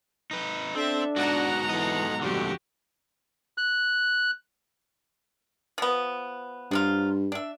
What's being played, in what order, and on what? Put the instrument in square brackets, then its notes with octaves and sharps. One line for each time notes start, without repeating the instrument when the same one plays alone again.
[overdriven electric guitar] D#4 B4
[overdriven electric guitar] C4 [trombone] D4 [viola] A4 E5
[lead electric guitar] G#2 B2 [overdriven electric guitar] F#4 [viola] F#5 A#5
[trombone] E3 [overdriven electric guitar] A4 D#5
[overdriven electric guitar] F2 D3 [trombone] G3 [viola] F#4 G4
[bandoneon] F#6
[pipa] F3 B3
[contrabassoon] G2 [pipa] F3 F#3 F4
[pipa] D4 E5